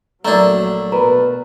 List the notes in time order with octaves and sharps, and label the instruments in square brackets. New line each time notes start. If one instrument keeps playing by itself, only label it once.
[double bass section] A#1 F#3 A#3 [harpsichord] A3 D4 [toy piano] A#4 D5 A#5
[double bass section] B2 [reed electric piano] A#4 B4 [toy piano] A#5